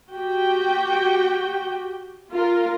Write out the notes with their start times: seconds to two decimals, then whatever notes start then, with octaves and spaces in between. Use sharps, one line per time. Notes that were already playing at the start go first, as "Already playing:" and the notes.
0.13 F#4 G4 G5
2.30 F4 A#4